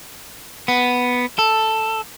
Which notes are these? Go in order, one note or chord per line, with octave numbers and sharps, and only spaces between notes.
B3
A4